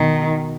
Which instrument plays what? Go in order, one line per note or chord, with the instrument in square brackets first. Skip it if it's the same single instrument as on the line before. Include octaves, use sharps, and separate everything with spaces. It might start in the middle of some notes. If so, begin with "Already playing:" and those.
Already playing: [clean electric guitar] B2 [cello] D#3